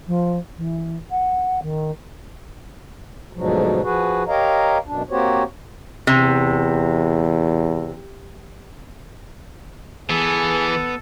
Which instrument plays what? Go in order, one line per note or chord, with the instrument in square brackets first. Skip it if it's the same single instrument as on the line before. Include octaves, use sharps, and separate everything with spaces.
[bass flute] F3
E3
F#5
D#3
[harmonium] D2 G#2 B2 F3 F#3
F3 F#4 G#4 B4
G4 A#4 C#5 D#5 F5 A#5
F#2 B2 D4
A#3 C4 F#4 G4 C5 C#5
[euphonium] E2 [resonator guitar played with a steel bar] C3
[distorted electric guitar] E3 [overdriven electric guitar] B3 [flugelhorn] G#4 [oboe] A4